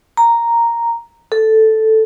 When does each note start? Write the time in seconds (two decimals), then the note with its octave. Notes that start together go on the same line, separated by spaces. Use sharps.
0.17 A#5
1.32 A4